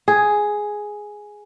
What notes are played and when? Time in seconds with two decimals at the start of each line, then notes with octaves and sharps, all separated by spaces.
0.08 G#4